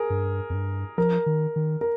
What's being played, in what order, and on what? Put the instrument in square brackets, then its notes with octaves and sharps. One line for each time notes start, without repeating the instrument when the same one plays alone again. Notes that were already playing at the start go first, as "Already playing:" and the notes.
Already playing: [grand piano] G#4 A#4
[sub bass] G2
F2
G2
[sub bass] F3 [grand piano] A#4
[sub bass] D#3
D#3
[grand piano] A#4